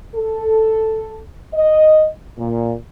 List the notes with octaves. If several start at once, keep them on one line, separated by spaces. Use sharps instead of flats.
A4
D#5
A#2